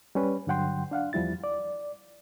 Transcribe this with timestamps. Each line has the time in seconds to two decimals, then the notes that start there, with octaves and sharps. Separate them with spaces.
0.15 G3 C#4 B4
0.47 G2 D3 F#3 F#5 G5 C6
0.91 D4 F5 F#5
1.13 E2 F3 G3 E4 A6
1.44 D5